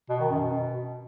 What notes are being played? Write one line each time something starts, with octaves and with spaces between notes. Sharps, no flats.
B2
D#3
F#2
B2